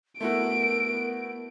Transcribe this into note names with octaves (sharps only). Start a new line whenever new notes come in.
A3 B3 E4 F#4 A#4 D7